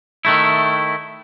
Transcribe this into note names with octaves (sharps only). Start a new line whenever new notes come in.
D#3 A3 E4